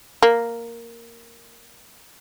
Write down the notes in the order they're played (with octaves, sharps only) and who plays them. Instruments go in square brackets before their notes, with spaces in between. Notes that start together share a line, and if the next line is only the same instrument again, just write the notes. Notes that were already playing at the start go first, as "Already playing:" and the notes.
[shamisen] A#3